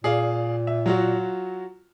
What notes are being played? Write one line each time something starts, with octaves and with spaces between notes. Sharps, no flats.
A#2 G#4 D5 F5
E5
F#3 F4 F#4